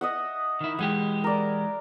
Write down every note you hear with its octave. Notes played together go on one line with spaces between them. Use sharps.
D#5 E5 F#5
D#3 E4
E3 G#3 G4 F#5
A#4 D5